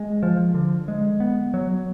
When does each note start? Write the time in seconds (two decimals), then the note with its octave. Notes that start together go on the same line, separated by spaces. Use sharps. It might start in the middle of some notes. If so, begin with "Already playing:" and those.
Already playing: G#3
0.23 F3
0.54 D3
0.88 G#3
1.20 B3
1.54 F#3